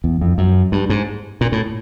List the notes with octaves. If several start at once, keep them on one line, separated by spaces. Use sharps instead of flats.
E2
F2
F#2
G2
G#2
A#2
A2